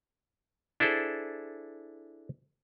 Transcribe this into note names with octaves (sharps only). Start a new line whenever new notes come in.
D4 E4 G#4 A4 C5